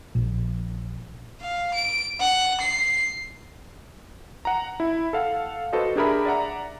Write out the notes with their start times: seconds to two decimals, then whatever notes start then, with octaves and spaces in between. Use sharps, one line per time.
0.15 A#1
1.41 F5
1.73 D7
2.19 F#5
2.60 C7
4.45 F#5 A#5
4.80 E4
5.13 A4 F5 F#5
5.73 F#4 A4 B4 C5 D#5
5.96 D4 G4 G#4 A#4 E5 B5
6.26 D5 E5 F#5 A#5